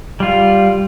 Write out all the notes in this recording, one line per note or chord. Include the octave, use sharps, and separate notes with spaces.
G3 F4